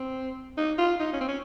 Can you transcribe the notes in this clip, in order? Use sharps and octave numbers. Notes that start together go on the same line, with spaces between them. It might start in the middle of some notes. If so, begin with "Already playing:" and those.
Already playing: C4
D#4
F4
D#4
C#4
C4
C#4